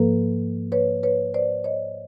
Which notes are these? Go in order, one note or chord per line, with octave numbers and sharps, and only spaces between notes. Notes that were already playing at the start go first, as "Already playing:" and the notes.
Already playing: G#2 F3 A#3 A4 B4
B4 C#5
B4 C#5
C5 D5
C#5 D#5